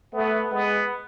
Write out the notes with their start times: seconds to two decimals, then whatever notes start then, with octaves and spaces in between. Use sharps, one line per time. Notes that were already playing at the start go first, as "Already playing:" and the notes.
0.13 A3 B3
0.51 G#3 B3